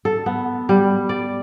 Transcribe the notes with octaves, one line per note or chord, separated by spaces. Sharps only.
A4
B3
G3
D5